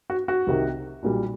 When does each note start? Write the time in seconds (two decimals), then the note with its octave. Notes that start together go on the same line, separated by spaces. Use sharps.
0.10 F#4
0.28 F#4
0.47 C2 C3 D#3
1.03 B1 A#2 G3